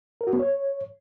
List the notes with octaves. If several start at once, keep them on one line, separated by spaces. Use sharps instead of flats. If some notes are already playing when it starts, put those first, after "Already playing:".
A#4
F#4
B3
C#5